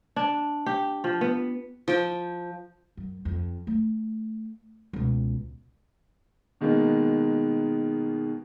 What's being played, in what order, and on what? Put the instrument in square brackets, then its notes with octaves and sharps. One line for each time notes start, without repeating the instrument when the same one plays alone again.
[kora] D4
G4
F3
B3
[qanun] F3 G5
[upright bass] F#2
F2
A3
C#2 B2
[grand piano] B2 D#3 G#3 A#3 B3